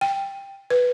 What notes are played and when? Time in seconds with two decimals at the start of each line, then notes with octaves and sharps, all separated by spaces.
0.01 G5
0.70 B4